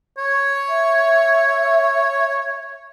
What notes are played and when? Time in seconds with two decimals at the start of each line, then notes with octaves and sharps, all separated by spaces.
0.18 C#5
0.69 E5